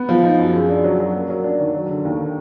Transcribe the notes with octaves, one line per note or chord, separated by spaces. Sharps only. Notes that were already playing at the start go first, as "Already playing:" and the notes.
Already playing: B3
F3
D#4
F#2
G#4
D4
F#3
F#3
A#3
F#3
D4
D#3
F#3
D3
D#2